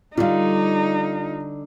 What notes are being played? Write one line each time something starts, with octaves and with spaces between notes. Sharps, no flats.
D3 G3 D#4 F4 F5